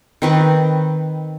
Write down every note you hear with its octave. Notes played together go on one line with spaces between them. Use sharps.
D#3 C4 B4